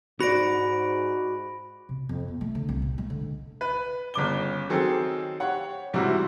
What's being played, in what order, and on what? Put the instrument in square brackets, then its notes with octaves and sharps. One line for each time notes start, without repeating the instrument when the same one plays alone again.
[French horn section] G#2 [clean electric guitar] F#4 D5 [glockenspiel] B5 A#6 D7
[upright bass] C3
F2
B3
A3
D3
C2
A#2
G#3
D3
[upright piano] B4
G1 C#3 D6 G7
D#3 F#3 C4 G#4 A4
G4 C#5 F#5
G#2 C3 E3 G3 E4 F#4